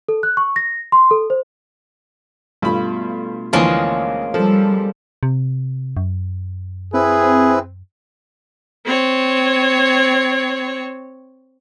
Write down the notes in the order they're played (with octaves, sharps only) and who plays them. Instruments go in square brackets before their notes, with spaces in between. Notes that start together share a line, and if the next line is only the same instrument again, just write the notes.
[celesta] A4
F#6
C#6
A#6
C6
A4
C5
[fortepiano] G2 B5 [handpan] B2 A3 F4
[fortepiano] D2 E3 F3 [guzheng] G#3 A#3 C#4
[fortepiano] F3 [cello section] G3 [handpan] A4
[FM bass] C3
F#2
[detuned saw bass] C4 [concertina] E4 B4 [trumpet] G#4
[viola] C4 C#5